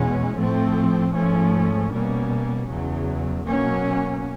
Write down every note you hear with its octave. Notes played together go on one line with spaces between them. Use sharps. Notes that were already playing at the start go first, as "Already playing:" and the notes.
Already playing: E2 B2 G#3 C#4
A2 F3 A3 C4
G#2 F3 A3 C#4
B2 G3 A#3 C#4
E2 C#3 F#3
B2 F#3 A#3 C#4